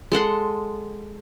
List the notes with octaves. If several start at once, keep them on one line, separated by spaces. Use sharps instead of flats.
G#3 A4 F#5 C6